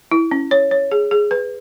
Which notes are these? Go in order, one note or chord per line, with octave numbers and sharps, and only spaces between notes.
E4
C#4
C#5
C#5
G#4
G#4
B4